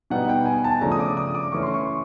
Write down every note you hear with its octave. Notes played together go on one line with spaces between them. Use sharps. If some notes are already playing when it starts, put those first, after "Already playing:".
B2 G3 B3 D#4 F#5
G5
G#5
A5
C#3 F3 A3 D4 A#5
D#6
D6
D#6
D6
E3 A3 C#4 E4 C#6
C6
C#6